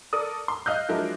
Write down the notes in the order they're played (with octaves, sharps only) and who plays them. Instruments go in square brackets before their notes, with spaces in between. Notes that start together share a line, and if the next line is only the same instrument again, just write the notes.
[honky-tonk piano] A4 A#4 D5 D#6
C6
D#5 F5 F#6 G6
F3 F#3 G#3 D4 E4 A#4